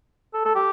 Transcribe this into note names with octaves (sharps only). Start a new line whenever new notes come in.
A4
A4
G4